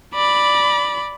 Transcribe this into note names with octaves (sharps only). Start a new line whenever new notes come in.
D5 B5